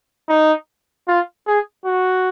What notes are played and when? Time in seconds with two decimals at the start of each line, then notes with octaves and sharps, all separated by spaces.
0.29 D#4
1.08 F4
1.47 G#4
1.85 F#4